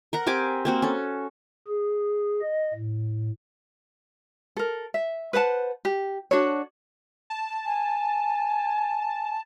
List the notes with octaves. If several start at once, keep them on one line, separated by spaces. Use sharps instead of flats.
A#4 F#5 A#5
C4 G4 G#5 D6
A#3 C4 F#4
C#4 A4
G#4
D#5
A2
A4 A#4
E5
B4 C5 F#5 A5
G4
D4 F#4 A4 C#5
A5
G#5